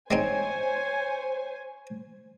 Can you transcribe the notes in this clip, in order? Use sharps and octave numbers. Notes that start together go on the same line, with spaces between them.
G#3 C4 D#4 C5 C#5 G#5